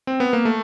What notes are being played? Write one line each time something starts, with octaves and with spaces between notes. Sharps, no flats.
C4
B3
A#3
A3